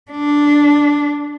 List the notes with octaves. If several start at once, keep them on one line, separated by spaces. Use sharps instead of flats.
D4